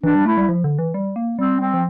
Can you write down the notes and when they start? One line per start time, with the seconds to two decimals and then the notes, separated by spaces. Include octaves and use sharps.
0.04 E3 D4
0.15 G3
0.26 A3 E4
0.37 G3
0.49 F3
0.64 D3
0.79 E3
0.94 G3
1.16 A#3
1.39 G3 C4
1.61 C4
1.74 F3